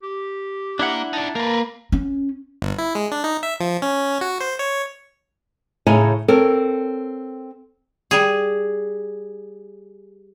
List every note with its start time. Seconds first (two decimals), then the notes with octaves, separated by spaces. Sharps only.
0.03 G4
0.79 A#3 D4 E4 F#5
1.13 D#4 D5 A5
1.35 A#3 A#4 B4
1.92 C#4
2.62 G1
2.78 E4
2.95 G#3
3.12 D4
3.24 D#4
3.43 E5
3.60 F3
3.82 C#4
4.21 F#4
4.41 C5
4.59 C#5
5.87 A2 C#3 D#4 C#5 G#5
6.28 C4 A4 A#4 C#5
8.11 G3 G#4